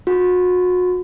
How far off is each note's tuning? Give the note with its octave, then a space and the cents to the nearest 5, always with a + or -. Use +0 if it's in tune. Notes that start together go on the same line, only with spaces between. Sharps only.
F#4 -35